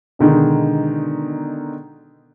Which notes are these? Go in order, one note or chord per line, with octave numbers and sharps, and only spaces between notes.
B2 D3 D#3 G#3 D#4